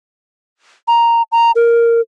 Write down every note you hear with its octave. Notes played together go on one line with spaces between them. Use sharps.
A#5
A#5
A#4